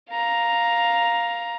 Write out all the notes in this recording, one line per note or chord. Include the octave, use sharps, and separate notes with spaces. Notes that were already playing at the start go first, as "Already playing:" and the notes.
F5 A#5